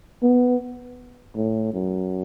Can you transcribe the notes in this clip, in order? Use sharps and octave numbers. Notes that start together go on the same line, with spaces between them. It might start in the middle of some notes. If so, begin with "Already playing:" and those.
B3
A2
F#2